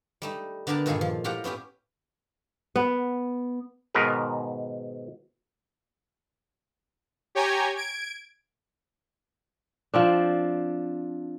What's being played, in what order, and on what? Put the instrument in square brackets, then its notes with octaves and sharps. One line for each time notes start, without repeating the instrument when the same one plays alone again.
[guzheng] G3 A3 D#4
D3 B3 D4 G4 A#4 A5
G2 A#2 D#3 G#4 A4 G#5
F3
A2 F4 G4 F#5 A#5
B3 C#4 E4 G4
[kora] B3
[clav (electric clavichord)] G#2 B2 D#3 A#4 B4
[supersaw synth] G4 C#5 G5 G#5 A#5 G#6
G#6 D7
[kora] F3 C4 D4